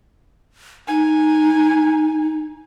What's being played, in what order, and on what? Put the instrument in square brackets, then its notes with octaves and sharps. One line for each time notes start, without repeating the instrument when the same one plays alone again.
[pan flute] D#4 [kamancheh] G#5